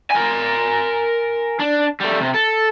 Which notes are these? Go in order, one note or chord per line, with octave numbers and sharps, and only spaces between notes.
A#4 G#5
D4
G3 A3
C3
A4